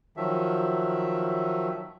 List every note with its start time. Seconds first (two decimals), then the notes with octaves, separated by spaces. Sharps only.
0.17 D#3 F3 F#3 E5